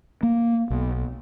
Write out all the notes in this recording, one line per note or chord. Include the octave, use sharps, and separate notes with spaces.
A#3
B1